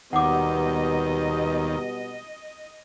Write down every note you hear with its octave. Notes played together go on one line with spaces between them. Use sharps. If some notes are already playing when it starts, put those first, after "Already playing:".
D#2 B2 G3 B3 D#5 F#5 D6